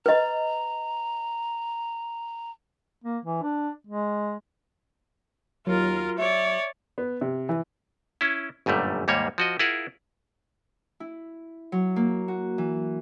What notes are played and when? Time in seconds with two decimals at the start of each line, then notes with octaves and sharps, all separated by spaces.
0.06 B4 D#5 A#5
3.04 A#3
3.25 E3
3.42 D4
3.87 G#3
5.67 D#2 F#3 F4 A#4
6.18 C#5 D5 E5
6.98 B3
7.21 C3
7.49 E3
8.21 C#4 E4
8.66 G1 F#2 A#2 G3 A3
9.08 D#2 G#2 G3 A#3 C#5
9.38 F3 F#4 D#5
9.59 E4 F4 G#4 A#4 F#5
11.00 E4
11.72 F#3
11.96 A#3
12.28 F#4
12.58 E3